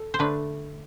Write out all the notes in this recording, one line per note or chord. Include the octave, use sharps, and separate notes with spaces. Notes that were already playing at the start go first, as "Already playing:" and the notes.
Already playing: A4
C5
D3 A3 D4 B4